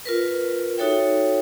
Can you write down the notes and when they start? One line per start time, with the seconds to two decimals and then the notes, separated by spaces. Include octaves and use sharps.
0.05 F4 A#4 B4
0.78 D#4 F#4 A4 C#5 E5 G5